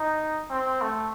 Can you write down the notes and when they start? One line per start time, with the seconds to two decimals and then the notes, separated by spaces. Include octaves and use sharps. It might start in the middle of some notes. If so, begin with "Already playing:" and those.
Already playing: D#4
0.50 C4
0.82 A3